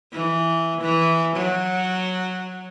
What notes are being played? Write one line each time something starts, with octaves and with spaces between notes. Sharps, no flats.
E3
E3
F#3